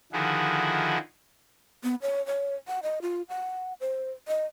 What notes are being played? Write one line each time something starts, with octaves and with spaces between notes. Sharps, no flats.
D3 D#3 F3 E4 F#4 G#4
B3
C#5
C#5
F#5
D#5
F4
F#5
C5
D#5